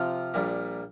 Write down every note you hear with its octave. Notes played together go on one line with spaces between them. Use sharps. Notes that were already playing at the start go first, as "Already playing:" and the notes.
Already playing: C3 F3 C4 F4
A#1 A#2 G3 A#3